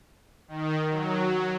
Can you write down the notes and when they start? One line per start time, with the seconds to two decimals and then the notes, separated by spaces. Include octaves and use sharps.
0.48 D#3
0.89 F#3